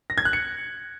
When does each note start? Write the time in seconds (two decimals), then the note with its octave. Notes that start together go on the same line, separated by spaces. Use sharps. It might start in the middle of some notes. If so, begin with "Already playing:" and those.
0.10 A#6
0.18 G#6
0.25 F#6
0.33 C#7